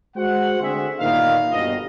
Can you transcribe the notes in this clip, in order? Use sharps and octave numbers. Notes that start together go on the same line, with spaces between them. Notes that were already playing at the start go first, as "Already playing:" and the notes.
G#3 F#4 C5 F#5
D2 C4 G#4 E5
G1 A#2 D#3 E3 D#4 F5
G1 B2 D#5